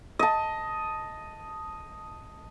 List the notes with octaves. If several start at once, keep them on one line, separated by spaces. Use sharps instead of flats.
D#5 A5